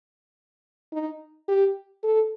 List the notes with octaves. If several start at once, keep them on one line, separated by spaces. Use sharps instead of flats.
D#4
G4
A4